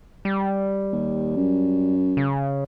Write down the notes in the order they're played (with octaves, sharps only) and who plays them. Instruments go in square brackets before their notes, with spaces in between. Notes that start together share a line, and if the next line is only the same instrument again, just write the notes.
[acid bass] G3
[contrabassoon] D#2
F#2
[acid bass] C#3